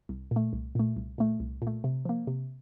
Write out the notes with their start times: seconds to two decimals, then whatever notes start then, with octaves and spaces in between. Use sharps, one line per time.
0.09 C2
0.31 A#2
0.36 A3
0.53 C2
0.75 A#2 A3
0.96 C2
1.18 A#2 A3
1.40 C2
1.62 A#2
1.67 A3
1.84 C3
2.05 F3 A#3
2.27 C3